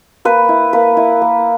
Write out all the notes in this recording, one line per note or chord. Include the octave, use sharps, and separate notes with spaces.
A#3 B4
E4
A#3 B4
E4
A#3